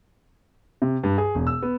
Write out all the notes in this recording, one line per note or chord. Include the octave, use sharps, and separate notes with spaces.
C3
G2
G#4
E1
E6
B3